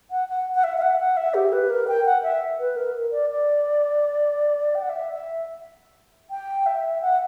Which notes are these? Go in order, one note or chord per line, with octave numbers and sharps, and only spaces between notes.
F#5
F#5
F#5
E5
E5
F#5
F#5
E5
G4
B4
A#4
G5
F#5
E5
B4
A#4
D5
D5
G5
F#5
E5
E5
G5
E5
F#5